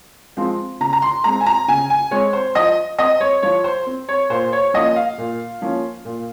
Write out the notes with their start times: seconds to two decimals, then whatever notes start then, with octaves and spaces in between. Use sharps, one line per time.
0.37 F3 G#3 C4
0.80 C#3 A#5
0.93 A#5
1.02 C6
1.24 G#3 C4 A#5
1.40 G#5
1.46 A#5
1.68 C#3 G#5
1.90 G#5
2.11 G#3 C4 C#5
2.33 C5
2.55 F3 D#5
2.98 C4 D#5
3.21 C#5
3.43 F3 C#5
3.64 C5
3.86 C4
4.09 C#5
4.30 A#2 C5
4.53 C#5
4.74 F3 A#3 C#4 D#5
4.96 F5
5.18 A#2
5.62 F3 A#3 C#4
6.05 A#2